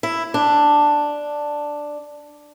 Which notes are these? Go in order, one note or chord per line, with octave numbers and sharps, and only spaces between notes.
E4
D4